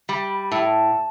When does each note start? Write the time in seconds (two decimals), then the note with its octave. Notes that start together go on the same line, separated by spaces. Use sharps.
0.09 G3
0.30 B5
0.51 A2 A5